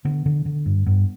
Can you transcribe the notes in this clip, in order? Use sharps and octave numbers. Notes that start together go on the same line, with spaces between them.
D3 B3
D3
D3
G2
G2 B3